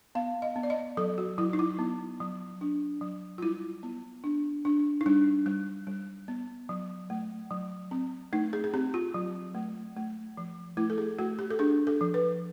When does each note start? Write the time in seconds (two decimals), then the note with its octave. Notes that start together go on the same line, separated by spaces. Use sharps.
0.15 B3 F5
0.42 D#5
0.56 B3
0.63 D5
0.70 D#5
0.97 F#3 A4
1.18 F#4
1.38 F#3 E4
1.53 D#4
1.59 E4
1.79 B3
2.20 F#3
2.61 D4
3.01 F#3
3.38 F4
3.42 G3 E4
3.83 B3
4.24 D4
4.65 D4
5.01 D#4
5.06 G3 D4
5.46 G3
5.87 G3
6.28 B3
6.69 F#3
7.10 A3
7.51 F#3
7.91 C4
8.33 A3 D#4
8.53 G#4
8.64 G#4
8.74 C4 G4
8.94 F4
9.14 F#3
9.55 A3
9.97 A3
10.37 F3
10.77 A3 E4
10.90 A4
10.98 G#4
11.18 A3 F#4
11.39 G4
11.50 A4
11.59 D4 G#4
11.87 A4
12.01 F3
12.14 B4